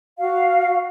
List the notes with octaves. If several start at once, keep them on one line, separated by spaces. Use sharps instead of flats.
F#4 F5